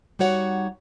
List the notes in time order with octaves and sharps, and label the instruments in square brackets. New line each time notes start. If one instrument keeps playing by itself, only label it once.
[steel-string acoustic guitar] G3 D#4 F#4 C#5 F#5